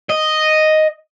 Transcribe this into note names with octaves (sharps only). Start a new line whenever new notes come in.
D#5